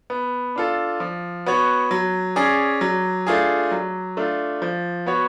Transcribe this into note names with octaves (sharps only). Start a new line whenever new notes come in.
B3
D4 F4 A4
F3
B3 F#4 C#5
F#3
C#4 G#4 D5
F#3
A3 D4 F4 G#4
F#3
A3 D4 F4
F3
B3 F#4 C#5